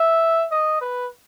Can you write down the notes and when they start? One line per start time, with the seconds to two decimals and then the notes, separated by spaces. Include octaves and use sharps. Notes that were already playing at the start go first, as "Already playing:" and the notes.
Already playing: E5
0.51 D#5
0.81 B4